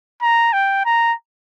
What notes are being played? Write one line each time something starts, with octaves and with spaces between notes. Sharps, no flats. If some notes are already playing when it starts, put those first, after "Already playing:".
A#5
G5
A#5